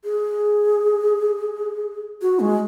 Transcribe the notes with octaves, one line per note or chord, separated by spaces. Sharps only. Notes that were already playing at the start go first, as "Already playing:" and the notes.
G#4
F#4
G#3